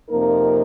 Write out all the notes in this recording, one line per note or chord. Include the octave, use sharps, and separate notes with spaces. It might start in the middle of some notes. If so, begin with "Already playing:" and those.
F2 C3 F3 A#3 D#4 A#4